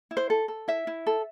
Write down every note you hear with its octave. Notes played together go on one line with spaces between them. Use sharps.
E4
C5
A4
A4
E4 E5
E4
A4